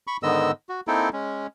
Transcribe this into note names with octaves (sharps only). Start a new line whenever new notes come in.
B5 C#6
G#2 D3 D#3 B3 D#5 E6
F#4
A#3 C4 D#4 E4 A4 G5
G#3 C#4